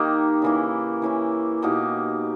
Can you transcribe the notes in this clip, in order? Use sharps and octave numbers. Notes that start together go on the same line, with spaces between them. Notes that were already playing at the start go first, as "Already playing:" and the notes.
Already playing: D#3 A#3 D#4 G4
C#3 E3 A#3 E4
E3 A#3 C#4 E4
B2 A#3 D#4 G4